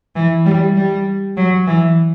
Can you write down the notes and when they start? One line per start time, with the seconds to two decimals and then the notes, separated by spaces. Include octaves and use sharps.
0.15 E3
0.45 G3
0.75 G3
1.37 F#3
1.67 E3